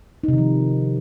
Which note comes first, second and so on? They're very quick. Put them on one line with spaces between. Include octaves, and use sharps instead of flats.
D#4 C3 D#3 F3